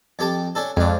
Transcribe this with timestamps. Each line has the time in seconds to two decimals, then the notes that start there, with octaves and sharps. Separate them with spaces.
0.19 F2 G4 A5
0.55 C#4 D4 A4
0.77 F2 G#3 D4